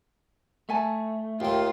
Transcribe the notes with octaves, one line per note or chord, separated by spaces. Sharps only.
A3 E5 G#5 A5
D#2 D#3 F4 E5 G5